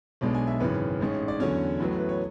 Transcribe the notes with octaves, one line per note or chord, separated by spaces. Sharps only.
B1 B2 G#3 D4
G#5
E5
G#1 F#2 C#3 E3 B4
A1 G#2 G#3 C#4
D5
E2 D3 F#3 C#4 C#5
A1 A2 F#3 B3
B4
C#5